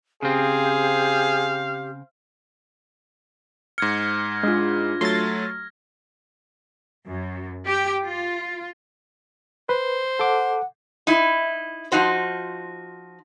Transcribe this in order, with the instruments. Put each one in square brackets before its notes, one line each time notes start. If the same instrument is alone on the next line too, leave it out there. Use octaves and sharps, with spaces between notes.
[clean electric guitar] C#3 C4 [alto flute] G4 [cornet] G#4 [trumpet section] C5 F5
[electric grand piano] G#2 C#7 [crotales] F6 G#6 A#6
[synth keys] G#3 [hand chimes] D4 F4
[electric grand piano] F#3 A3 [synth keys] C6 A6
[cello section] F#2
G4
F4
[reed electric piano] B4 [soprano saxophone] C5
[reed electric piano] A4 D6 [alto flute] F#5
[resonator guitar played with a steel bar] D#4 E4
F3 D#4 F#4 C5